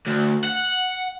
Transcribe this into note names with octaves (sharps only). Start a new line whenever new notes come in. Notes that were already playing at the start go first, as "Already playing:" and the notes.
D2
F#5